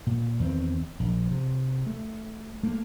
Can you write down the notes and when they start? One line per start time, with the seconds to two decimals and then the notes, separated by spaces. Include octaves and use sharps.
0.07 A#2
0.40 E2 D#3 C4
1.00 A#1
1.31 C3
1.87 A3
2.63 A3 A#3